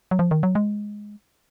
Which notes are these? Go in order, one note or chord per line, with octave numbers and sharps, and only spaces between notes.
F#3
F3
D#3
F#3
G#3